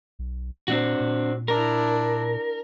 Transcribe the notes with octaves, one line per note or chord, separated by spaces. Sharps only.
B1
A#2 C4 D4 F#4
A#2
D4 E4 A#4